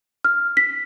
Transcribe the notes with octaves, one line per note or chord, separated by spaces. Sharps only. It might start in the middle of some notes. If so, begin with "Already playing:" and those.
F6
B6